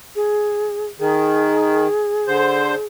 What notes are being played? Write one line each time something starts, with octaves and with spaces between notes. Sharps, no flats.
G#4
D#3 G#4
D3 C5